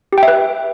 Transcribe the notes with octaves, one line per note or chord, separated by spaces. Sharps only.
G4
G5
E5
B4